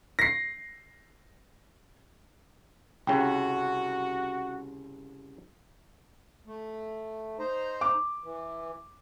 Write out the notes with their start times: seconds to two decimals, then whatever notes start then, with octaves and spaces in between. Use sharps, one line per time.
0.19 A#6 C7
3.07 C2 C#3 F#4 G5
6.45 A3
7.39 D#4 C5 A#5
7.81 D6
8.24 E3